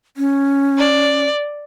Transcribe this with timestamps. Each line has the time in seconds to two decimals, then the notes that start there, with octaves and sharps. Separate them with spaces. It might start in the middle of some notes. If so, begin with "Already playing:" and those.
0.17 C#4
0.78 D5